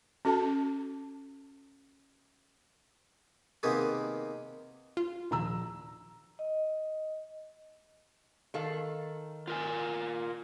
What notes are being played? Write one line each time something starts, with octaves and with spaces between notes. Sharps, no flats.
C#4 F#4 A4 A5
C3 D#3 A#3 B3 G4 G#4
F4
A#1 D#2 A#5 E6
D#5
D#3 A4 F5
F4 A#4 G#5